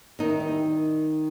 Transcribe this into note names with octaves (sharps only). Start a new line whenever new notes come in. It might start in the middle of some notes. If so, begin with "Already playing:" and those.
D#3 E3 D#4
G3